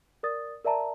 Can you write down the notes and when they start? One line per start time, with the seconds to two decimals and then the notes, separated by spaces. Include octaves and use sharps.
0.23 A#4 D5 D#6 A6
0.64 A#4 D5 E5 A5 A#5